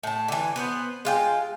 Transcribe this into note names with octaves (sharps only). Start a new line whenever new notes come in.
A2 A5
D3 E3
B3 B4 C5
G#3 F4 G5